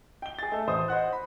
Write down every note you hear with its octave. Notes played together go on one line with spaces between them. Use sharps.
G5 G7
G#4 A6
A3 A4
A1 C5 D#6
C5 D#5 F#5 F#6
B5